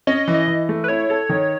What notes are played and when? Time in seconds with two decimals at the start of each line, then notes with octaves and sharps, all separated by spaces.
0.07 C#4 D#5
0.28 E3
0.34 D#5
0.47 E3
0.69 A3
0.84 B4
0.88 E4 C#5
1.10 A4
1.29 D#3